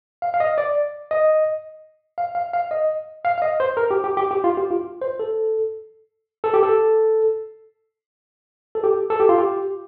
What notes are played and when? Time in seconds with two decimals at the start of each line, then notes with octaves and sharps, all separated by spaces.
0.22 F5
0.34 F5
0.40 D#5
0.58 D5
1.11 D#5
2.18 F5
2.35 F5
2.53 F5
2.71 D#5
3.25 F5
3.38 F5
3.42 D#5
3.60 C5
3.77 A#4
3.91 G4
4.04 G4
4.17 G4
4.31 G4
4.44 F4
4.57 G4
4.71 F4
5.02 C5
5.19 A4
6.44 A4
6.54 G4
6.63 A4
8.75 A4
8.84 G4
9.10 A4
9.20 G4
9.29 F4
9.38 G4